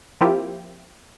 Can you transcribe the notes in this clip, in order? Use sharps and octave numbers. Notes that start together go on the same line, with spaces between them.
F3 A#3 C4 E4 F4 G4